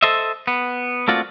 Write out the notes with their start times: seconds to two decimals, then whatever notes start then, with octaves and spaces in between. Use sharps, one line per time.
0.03 A4 C5 D#5 E5
0.47 B3
1.08 A3 A#3 C4 F4 F#4 D5